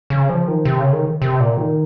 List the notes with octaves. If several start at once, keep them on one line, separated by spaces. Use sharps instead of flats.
C#3
F3
D#3
C3
C#3
D#3
C3
A#2
D#3